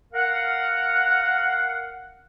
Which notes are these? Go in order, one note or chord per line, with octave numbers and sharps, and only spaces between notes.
A#4 F5 F#5